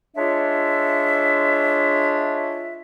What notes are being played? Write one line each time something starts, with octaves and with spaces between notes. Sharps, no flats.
G#3 D4 F4 C#5 E5